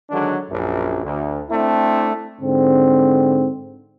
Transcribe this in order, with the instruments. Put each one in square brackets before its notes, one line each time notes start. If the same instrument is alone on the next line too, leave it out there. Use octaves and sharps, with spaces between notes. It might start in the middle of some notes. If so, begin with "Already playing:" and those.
[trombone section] D3 D#3 F#3 G#3 D4
A#1 F#2
D2
A3 C4 D4 E4
G#2 D3 C4